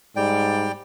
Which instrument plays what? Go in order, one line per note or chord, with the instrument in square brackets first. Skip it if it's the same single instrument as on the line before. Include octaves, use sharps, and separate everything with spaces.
[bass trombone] G#2 [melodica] G3 D5 G5